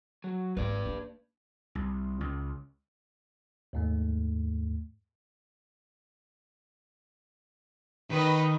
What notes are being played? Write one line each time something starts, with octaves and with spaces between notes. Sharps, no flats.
F#3
G#1 A#3 B4 D5
A#3 D4
C2
C#2
D#2 G#2 A3
D#3 B4 D#5